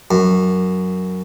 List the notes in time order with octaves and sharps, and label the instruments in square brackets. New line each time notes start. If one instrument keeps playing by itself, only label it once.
[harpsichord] F#2